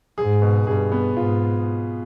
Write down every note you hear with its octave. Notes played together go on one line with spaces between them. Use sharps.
G#2 G#4
B2
G2 G#4
B3
G#2 F4